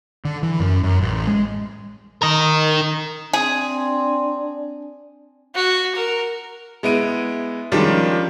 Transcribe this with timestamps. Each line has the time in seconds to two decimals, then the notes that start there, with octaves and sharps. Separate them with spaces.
0.25 D3
0.43 E3
0.60 F#2
0.83 F#2
1.01 A1
1.27 G#3
2.22 A#4 D#5
3.33 C4 D4 G#4
5.55 F#4
5.95 A#4
6.83 G#3 B3 E4 D7 D#7
7.72 D#3 F3 G3 G#3 C#4 D4